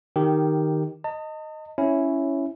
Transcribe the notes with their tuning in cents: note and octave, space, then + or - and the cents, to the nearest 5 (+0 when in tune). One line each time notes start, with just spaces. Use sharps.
D#3 -5 G4 +0
D#5 +0 A5 +45
C#4 +0 E4 +0 C#5 -5